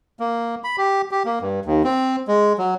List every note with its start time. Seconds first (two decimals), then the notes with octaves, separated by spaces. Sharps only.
0.20 A#3
0.64 B5
0.78 G4
1.11 G4
1.25 A#3
1.42 G2
1.66 D#2
1.84 C4
2.28 G#3
2.58 F#3